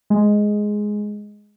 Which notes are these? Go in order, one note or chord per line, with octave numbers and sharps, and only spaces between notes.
G#3